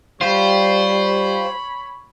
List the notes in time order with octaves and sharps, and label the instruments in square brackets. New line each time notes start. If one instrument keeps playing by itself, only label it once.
[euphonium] G3 [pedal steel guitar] F4 G4 [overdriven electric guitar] C5 [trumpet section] C#5 B5